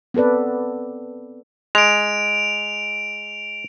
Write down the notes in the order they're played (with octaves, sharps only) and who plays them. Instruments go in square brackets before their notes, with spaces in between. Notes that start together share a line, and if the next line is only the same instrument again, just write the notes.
[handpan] B3 C4 A4 B4 D5
[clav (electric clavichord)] G#3 [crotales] D7 F7